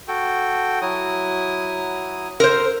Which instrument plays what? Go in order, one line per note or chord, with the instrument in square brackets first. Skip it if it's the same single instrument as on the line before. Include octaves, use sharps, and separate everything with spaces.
[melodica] F#4 A4 G5
F#3 E4 D#6
[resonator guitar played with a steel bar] A#4 C5 [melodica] E6